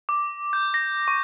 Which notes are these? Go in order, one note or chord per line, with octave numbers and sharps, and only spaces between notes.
D6
G6
A#6
C#6